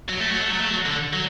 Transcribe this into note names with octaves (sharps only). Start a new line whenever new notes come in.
F#3
A3
F#3
A3
F#3
A3
F#3
D3
F#3